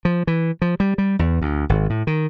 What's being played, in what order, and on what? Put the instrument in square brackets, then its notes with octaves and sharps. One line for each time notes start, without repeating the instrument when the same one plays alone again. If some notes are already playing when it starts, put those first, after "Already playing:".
[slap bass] F3
E3
F3
G3
G3
E2
D2
G#1
A2
D#3